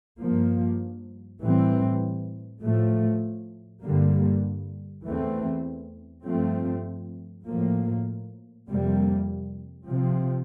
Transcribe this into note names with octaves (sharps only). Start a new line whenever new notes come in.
G2 F3 A#3
A2 E3 G3 C4
A2 F3 A3
G2 D3 G3 A#3
E2 E3 A3 C4
G2 F3 A3 C4
A2 F3 A#3
F2 C3 G3 A#3
C3 F3 C4